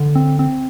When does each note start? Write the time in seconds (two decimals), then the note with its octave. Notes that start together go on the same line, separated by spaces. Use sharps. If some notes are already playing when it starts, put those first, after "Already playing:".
Already playing: D3
0.15 C4
0.39 C4